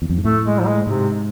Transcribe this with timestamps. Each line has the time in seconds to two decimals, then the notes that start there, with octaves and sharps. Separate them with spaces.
0.02 E2
0.09 F2
0.17 G#2
0.24 A2 A3
0.46 G#3
0.59 F3
0.66 G#3
0.86 G#2 C3